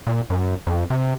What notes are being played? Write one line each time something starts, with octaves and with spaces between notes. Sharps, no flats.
A#2
F#2
F2
C3